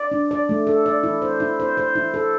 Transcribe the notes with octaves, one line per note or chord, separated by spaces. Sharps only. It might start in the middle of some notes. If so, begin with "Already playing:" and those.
Already playing: D5
D4
D5
A3
A4
D5
E4
C5
E4
C5
C5
E4
A4